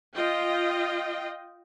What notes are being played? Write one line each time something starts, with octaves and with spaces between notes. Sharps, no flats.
F4 D#5 G5